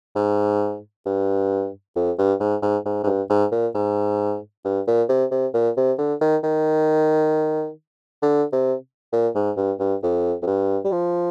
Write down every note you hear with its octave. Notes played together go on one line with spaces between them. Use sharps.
G#2
G2
F2
G2
G#2
G#2
G#2
G#2
G2
G#2
A#2
G#2
G2
A#2
C3
C3
A#2
C3
D3
D#3
D#3
D3
C3
A#2
G#2
G2
G2
F2
F2
G2
G3
F3